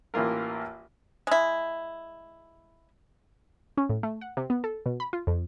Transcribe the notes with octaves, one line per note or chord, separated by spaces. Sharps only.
A1 E3 A#3 F4 A#4
G#3 E4
C#4
A2
A3
F#5
C3
B3
A4
B2
B5
F4
F2